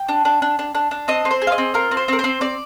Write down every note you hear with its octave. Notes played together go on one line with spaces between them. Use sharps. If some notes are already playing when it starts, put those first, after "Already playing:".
Already playing: G5
D4
D4
D4
D4
D4
D4
C4 D#5
C4
C5
G#4
F5
D#5
C4
F4 A#4
C4
C5
C4 A#4
C5
C4
C4 D5